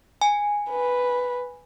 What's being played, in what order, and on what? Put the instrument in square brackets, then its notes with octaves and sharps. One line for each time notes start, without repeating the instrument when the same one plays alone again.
[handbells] G#5
[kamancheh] B4